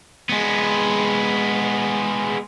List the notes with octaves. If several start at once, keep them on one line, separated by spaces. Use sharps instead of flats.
G#3 B3